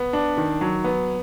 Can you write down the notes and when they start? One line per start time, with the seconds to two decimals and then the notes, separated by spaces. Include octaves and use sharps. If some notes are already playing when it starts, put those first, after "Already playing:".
Already playing: B3
0.13 D4
0.37 D#3
0.61 F#3
0.84 B3